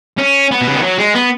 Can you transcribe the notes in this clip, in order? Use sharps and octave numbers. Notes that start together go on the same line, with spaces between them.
C#4
B3
B2
C#3
D#3
F#3
G#3
B3